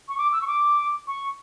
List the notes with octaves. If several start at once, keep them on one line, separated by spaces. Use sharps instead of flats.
C#6
D6
E6
C#6
D6
C#6